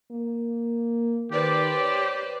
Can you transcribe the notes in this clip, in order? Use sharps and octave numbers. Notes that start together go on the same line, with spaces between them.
A#3
D#3 G4 B4 C5 D5
C#5